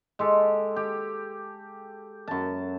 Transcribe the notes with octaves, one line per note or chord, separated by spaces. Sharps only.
G#3 G4 A4
G4
F#2 A5